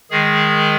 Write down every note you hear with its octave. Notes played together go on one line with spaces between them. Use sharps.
D#3 G#3 G#4